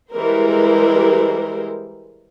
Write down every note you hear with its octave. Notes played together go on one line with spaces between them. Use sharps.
E3 G3 G#3 A#4 C5